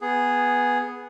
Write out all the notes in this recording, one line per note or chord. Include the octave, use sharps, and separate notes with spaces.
B3 G#4